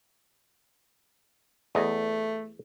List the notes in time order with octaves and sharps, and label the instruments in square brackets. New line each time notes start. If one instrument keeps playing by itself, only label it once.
[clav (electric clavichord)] E2 D#5 [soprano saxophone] A3